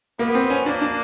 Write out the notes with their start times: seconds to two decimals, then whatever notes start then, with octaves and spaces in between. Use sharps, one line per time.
0.19 A#3 B3
0.35 C4
0.50 C#4
0.66 A#3 D4
0.82 D4